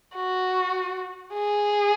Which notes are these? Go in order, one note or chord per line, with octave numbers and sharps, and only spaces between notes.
F#4
G#4